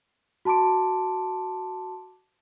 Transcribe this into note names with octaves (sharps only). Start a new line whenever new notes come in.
F#4 A5 C6 D6 D7